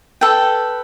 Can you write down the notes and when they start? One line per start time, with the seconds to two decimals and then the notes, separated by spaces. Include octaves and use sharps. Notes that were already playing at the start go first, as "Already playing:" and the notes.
0.21 A4 B4 G5